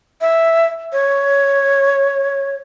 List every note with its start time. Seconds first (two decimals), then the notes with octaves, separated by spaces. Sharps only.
0.21 E5
0.93 C#5